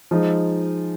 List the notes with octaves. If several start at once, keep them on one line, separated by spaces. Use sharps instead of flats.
F3 G#3 D#4